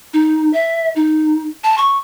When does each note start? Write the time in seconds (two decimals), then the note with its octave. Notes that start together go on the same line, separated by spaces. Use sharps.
0.14 D#4
0.53 E5
0.96 D#4
1.64 A5
1.78 C#6